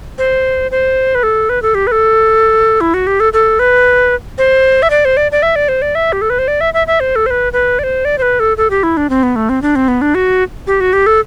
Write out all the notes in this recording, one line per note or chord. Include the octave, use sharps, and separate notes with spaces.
C5
C5
B4
A4
B4
A4
G4
B4
A4
E4
F#4
G4
A4
A4
B4
C5
E5
D5
C5
D5
D5
E5
D5
C5
D5
E5
G4
A4
B4
C5
D5
E5
E5
E5
C5
A4
C5
B4
B4
D5
C5
D5
C5
B4
A4
A4
G4
E4
D4
C4
B3
A3
C4
D4
C4
B3
D4
F#4
G4
F#4
G4
A4